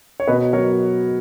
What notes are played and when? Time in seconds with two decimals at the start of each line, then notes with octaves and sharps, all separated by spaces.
0.20 C#5
0.27 B2 B4 D#5
0.53 F#3 A#4 C#5